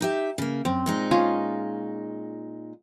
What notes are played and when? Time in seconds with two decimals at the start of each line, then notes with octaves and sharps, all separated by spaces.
0.01 D#4 G4 E5
0.38 C#3 A#3
0.65 F#2 C4
0.86 A#2 G#3 D#4
1.11 C#4 F4 G#4